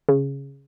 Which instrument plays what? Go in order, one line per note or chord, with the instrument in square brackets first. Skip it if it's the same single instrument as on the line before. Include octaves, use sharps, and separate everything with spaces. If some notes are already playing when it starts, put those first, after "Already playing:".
[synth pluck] C#3